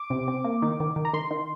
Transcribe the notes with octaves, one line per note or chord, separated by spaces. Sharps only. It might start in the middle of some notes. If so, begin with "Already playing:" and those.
Already playing: D6
C3
C4
A#3
D#3
D#3
D#3
A#5
D#3 C6
D#3